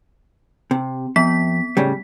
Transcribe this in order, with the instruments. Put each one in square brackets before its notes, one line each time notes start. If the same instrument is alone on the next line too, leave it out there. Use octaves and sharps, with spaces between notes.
[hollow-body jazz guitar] C3
[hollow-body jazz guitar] F2 [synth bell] B3 B6
[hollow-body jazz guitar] A2 C#3 G3